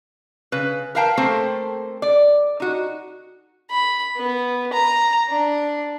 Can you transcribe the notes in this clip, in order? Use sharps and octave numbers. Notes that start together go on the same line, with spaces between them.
C#3 B4
A#4 B4 F5 G5 A5 A#5
A3 A#3 C4 A4 C5
D5
D#4 F#4
B5
B3
A#5
D4